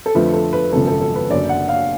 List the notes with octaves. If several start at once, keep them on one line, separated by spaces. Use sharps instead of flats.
A4
F2 D3 F3 A3 B4
A4
B4
G#1 F#2 C#3 F3 A4
A4
A4
B4
F#1 F#2 D3 D5
F#5
F5